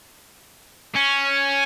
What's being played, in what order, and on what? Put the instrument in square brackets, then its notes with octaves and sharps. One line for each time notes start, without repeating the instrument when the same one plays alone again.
[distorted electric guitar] C#4